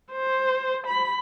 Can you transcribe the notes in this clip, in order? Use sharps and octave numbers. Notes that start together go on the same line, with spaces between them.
C5
B5